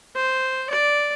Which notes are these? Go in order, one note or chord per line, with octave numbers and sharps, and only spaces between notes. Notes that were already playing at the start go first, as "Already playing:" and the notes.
C5
D5